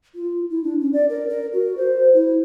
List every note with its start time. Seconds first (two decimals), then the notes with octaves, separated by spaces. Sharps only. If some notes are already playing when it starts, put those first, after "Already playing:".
0.15 F4
0.50 E4
0.64 D4
0.81 C#4
0.93 D5
1.10 A#4
1.29 A#4
1.53 F#4
1.77 C5
2.13 E4